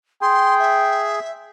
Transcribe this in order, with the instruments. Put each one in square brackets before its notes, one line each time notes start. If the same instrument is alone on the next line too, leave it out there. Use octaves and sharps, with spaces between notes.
[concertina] G#4 [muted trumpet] G5 [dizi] C6
[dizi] E5